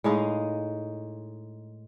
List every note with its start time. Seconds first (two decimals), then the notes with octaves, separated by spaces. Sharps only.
0.04 A2 G#3 D#4 F5